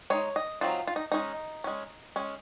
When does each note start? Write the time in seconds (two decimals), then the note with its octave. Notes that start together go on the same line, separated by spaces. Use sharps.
0.10 G#3 D#4 C#5
0.36 D#5
0.61 F#3 C4 D#4 F4
0.87 F4
0.96 D#4
1.12 G#3 C#4 D#4
1.64 G#3 C#4
2.16 G#3 C#4